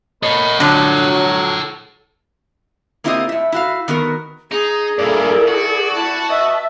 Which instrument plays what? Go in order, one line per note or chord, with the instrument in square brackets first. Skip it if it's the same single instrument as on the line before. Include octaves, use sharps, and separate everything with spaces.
[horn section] A#3 D#5 B5 [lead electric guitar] A4 C#5
[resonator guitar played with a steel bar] D3 F3 [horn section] F#3
[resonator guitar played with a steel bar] A#3 C4 E4 F4 G4 D#5
A2 E5
E4 F#4 F5
D#3 B3 F#4 A#4
[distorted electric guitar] D#4 [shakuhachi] G#4
[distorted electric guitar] G2 A#2 [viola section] E4 A4 A#4 [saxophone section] D5
[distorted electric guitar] F#4
[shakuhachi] E4 [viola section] A5
[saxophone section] B4 D#5 [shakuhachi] E5